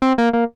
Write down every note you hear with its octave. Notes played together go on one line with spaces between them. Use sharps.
C4
A#3
A#3